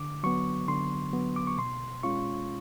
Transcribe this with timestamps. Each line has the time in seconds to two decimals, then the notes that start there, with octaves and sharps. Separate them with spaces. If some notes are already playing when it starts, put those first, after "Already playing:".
Already playing: D3 D6
0.23 F#3 B3 C#6
0.68 D3 C6
1.13 F#3 B3
1.36 D6
1.47 C#6
1.58 B2 C6
2.03 G#3 C#4 F4 C#6